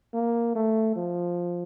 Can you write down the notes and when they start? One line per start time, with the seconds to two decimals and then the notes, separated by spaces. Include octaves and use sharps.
0.14 A#3
0.55 A3
0.96 F3